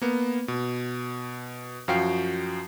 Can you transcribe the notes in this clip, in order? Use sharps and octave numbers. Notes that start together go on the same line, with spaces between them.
A#3 B3
B2
F#2 F3 F#4 F5 G5 C7